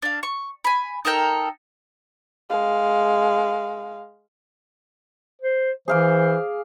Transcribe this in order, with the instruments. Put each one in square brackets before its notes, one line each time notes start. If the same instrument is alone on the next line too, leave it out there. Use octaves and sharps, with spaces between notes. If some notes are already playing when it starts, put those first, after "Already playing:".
[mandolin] D4 F5
C#6
G#5 B5
D#4 A4 A#4 G5
[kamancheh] G#3 F5
[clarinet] C5
[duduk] E3 [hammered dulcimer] G#4 F5 D6 [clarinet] C5